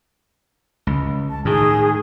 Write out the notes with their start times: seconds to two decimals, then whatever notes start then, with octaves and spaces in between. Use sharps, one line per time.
0.87 C#2
1.30 A5
1.45 A2 D#3 G#4